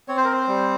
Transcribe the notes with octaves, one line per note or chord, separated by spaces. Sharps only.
C4 C#5
C5
A#4
C5
G3